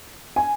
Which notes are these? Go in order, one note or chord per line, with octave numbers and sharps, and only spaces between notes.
G#5